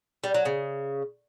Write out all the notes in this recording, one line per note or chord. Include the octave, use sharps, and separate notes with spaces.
G3
F#3
C#3